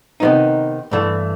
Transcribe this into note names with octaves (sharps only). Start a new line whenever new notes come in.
C3 D#3 F#3 B3 D#4
G2 E3 A3